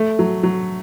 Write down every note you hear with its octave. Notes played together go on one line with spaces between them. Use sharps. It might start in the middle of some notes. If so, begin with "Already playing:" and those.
Already playing: A3
F#3
F#3